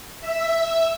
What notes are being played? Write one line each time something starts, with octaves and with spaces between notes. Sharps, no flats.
E5